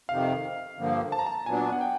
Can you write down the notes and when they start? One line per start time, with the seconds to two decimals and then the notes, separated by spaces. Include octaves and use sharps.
0.09 F2 C3 D#3 F5
0.78 G2 D3 F3 A#3
1.12 A5
1.19 A#5
1.26 A5
1.46 A#2 F#3 B3 D4 G#5
1.72 F#5
1.81 G5